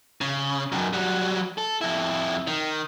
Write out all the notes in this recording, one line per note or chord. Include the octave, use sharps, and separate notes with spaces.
C#3
F#2 D#3
F#3 G3
A4
F2 E4
D#3